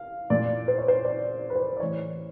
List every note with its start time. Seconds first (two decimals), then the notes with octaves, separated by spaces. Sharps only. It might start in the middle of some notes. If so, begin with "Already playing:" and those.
Already playing: F5
0.30 A#2 D5
0.68 C5
0.78 C#5
0.88 C5
1.05 D5
1.50 B4
1.56 C5
1.77 D5
1.80 A2 E3 C#5